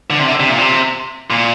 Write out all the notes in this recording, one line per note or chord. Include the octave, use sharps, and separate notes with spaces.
D3
C3
D3
C3
A#2
C3
A#2